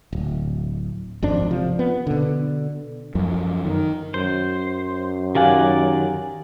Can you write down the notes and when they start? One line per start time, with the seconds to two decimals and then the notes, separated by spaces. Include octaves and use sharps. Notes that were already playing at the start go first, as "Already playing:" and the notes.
0.13 D1
1.22 G#1 F2 D4
1.50 C3 F3
1.79 B3
2.07 B2 D3
3.15 F#2 F3
3.65 D#3
4.14 F#2 C5
5.35 D#3 G4 D5 F5 F#5 G#5